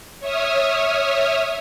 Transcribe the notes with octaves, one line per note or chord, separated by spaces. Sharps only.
C#5 E5 D#6 F6